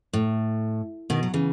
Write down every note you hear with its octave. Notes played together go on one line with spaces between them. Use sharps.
A2
B2 D#3
F#3
C#3 E3